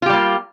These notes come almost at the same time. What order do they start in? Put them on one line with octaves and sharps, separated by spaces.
F4 G4 G3 A#3